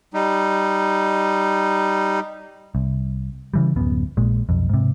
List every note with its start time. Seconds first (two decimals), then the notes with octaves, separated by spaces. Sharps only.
0.14 G3 D#4
2.75 C2
3.54 C#3 E3 G3
3.76 D1 F#2 B3
4.17 A#1 A#2 G#3
4.49 B1 F2
4.69 G#2 C3